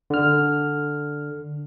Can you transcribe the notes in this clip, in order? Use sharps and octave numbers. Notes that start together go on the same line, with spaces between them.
D3 F6